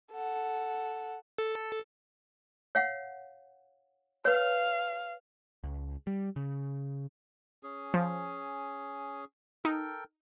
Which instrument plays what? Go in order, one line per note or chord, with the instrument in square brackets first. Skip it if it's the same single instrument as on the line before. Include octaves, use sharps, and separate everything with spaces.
[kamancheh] A4 F#5
[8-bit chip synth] A4
[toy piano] C#5 F5 F#5
[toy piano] B4 C#5 [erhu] F5
[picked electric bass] C#2
G3
C#3
[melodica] C#4 G#4
[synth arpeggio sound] F3
[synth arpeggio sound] D#4 [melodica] A4 A#4 G5